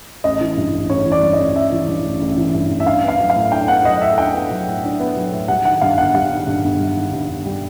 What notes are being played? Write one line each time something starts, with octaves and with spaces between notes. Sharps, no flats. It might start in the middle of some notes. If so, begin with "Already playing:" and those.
A1 D#5
E3
G2
A1
A1 C#5
E3
D5
G2
D#5
A1
A1 E5
E3
G2
A1
A1
E3
G2
A1
E5
D4 F5
B3 F5
F#3
F5
A2
D4 G5
B3 F#5
F#3 D#5
A2 E5
D4 G5
B3
F#3
A2
D4
B3
F#3
A2
G3 F#5
D#3 F#5
G2 F5
G1 F#5
G3 F5
D#3
G2
G1
G3
D#3
G2
G1
G3